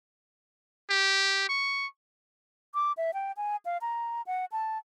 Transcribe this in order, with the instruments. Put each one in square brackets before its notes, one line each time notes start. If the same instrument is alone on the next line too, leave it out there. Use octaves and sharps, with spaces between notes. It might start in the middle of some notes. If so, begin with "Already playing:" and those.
[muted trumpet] G4
C#6
[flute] D6
E5
G5
G#5
F5
A#5
F#5
A5